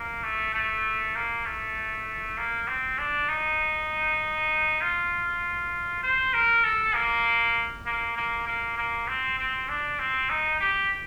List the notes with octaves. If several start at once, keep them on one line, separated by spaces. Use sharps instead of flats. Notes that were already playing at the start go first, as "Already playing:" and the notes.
Already playing: A#3
A3
A3
A#3
A3
A#3
C4
D4
D#4
F4
C5
A#4
A4
A#3
A#3
A#3
A#3
A#3
C4
C4
D4
C4
D#4
G4